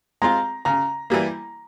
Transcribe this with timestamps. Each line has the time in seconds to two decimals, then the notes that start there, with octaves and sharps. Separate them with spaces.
0.22 G#3 C4 F4 A#5
0.65 C#3 A#5
1.10 E3 G3 A#3